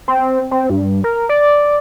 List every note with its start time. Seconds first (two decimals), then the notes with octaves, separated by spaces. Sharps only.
0.08 C4
0.51 C4
0.70 G2
1.04 A#4
1.29 D5